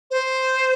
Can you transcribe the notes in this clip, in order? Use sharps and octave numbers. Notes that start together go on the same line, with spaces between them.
C5